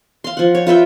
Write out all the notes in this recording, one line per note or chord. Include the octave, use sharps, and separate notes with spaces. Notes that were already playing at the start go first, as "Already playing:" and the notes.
F5 C6
F3 F#5
C#5
F4 B4 E5 G5